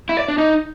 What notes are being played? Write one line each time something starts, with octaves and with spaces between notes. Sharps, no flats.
E4
D5
D4
D#4